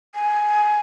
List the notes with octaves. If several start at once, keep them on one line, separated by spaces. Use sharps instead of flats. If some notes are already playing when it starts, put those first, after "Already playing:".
G#5